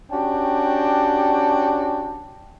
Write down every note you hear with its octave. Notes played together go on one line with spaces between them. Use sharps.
C#4 D4 F#4 G4 G5 A5